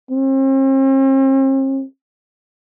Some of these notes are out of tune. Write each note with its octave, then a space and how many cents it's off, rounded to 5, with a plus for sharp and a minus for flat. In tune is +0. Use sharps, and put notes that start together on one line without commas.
C4 +45